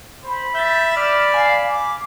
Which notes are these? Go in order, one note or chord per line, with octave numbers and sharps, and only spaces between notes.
C5 B5
E5 G6 A6
D5 F6 E7
F5 G#5
D6